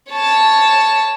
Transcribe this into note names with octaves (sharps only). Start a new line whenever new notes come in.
C#5 A5